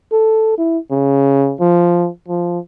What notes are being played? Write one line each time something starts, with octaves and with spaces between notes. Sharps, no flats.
A4
E4
C#3
F3
F3